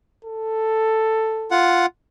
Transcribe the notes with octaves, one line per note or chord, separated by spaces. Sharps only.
A4
F4 F#5